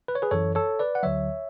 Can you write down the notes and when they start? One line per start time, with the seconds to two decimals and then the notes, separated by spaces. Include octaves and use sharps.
0.08 B4
0.15 C#5
0.22 G#4 B4
0.31 F#2 E3 A4 C#5
0.55 A4 C#5
0.79 B4 D5
0.95 F#5
1.03 D2 D3 F#3 C#5 E5